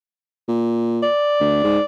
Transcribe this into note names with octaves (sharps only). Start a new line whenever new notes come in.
A#2
D5
D2
G#2